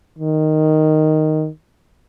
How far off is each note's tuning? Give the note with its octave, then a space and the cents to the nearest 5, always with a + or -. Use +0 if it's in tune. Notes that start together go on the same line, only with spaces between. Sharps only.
D#3 -5